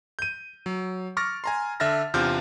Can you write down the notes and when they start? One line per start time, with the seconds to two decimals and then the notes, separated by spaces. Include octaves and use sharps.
0.19 G6 D#7
0.66 F#3
1.17 C#6 D6 F6 A6 A#6
1.44 G#5 A#5 C6
1.80 D3 E5 F6 A6 A#6
2.14 E2 C3 D4 F4 F6 G6